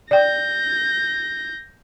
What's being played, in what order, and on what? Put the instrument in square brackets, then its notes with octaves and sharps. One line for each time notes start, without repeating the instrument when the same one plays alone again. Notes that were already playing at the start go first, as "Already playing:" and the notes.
[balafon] D5 G5 [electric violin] G6 A#6